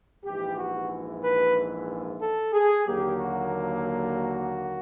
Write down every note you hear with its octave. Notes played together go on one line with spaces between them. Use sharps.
A#1 G#2 E3 G4
F#4
B4
A4
G#4
D#2 D3 F#3 A#3 G4
F#4
F#4